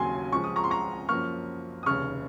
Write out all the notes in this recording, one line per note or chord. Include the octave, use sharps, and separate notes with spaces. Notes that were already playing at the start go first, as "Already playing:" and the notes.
Already playing: D#2 C#3 F#3 A#3 G#5 C6
C#2 C#3 F3 G#3 C#6
D#6
A#5 C#6
C6
A#5 C#6
F#2 F3 A#3 C#6 F6
D#6
F1 D#2 C#3 C#6 F6